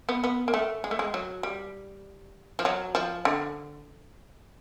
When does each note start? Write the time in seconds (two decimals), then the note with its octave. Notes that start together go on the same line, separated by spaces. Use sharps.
0.09 B3
0.24 B3
0.48 A#3
0.54 A3
0.84 G#3
0.91 A3
0.99 G#3
1.14 F#3
1.43 G3
2.59 F3
2.65 F#3
2.95 F3
3.25 D3